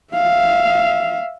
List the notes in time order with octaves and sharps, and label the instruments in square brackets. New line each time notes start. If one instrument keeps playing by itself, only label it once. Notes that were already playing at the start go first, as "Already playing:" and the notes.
[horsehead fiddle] E5 F5